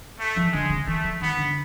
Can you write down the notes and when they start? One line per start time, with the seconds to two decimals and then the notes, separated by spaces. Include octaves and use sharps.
0.20 A3
0.36 F3
0.53 D3 G#3
0.70 C3
0.87 E3 A3
1.04 F3
1.21 D#3 B3
1.37 D3